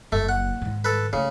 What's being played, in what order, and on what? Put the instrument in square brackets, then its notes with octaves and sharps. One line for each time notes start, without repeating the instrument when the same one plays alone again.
[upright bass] F#1 [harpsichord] A3
[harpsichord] F#5
[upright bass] G#2 D#3
[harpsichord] A4 B4
[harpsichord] C#3 [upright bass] A3